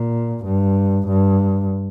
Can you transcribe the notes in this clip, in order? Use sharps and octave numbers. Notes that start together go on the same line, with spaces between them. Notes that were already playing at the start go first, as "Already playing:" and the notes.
Already playing: A#2
G2
G2